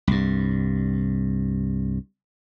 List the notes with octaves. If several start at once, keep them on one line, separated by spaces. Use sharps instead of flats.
C2 G2